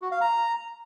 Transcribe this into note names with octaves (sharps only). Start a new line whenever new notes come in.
F#4
F5
A#5